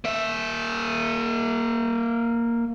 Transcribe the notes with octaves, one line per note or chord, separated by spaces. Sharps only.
A#3 E5